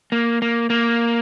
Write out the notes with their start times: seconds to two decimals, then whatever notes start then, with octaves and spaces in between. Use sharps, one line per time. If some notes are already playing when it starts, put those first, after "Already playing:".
0.12 A#3
0.42 A#3
0.70 A#3